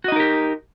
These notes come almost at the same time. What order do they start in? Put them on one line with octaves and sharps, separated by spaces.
F#4 D#5 D#4 A#4 G4